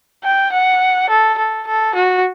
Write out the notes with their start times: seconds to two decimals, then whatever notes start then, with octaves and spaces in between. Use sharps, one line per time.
0.24 G5
0.52 F#5
1.09 A4
1.38 A4
1.67 A4
1.95 F#4